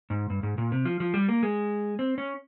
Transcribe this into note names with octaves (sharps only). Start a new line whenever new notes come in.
G#2
G2
G#2
A#2
C3
F3
F3
G3
A#3
G#3
C4
C#4